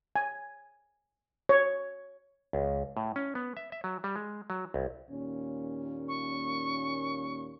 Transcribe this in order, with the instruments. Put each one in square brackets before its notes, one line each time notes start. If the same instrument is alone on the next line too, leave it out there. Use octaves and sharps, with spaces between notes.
[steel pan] G#5
C#5
[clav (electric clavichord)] C#2
A2
C#4
B3
E5
E5
F#3
G3
G#3
F#3
C2
[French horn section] D#2 A#2 C#4
[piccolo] C#6